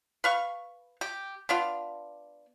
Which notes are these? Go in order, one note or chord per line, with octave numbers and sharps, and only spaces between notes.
B4 F5 C#6
G4
B3 D4 F4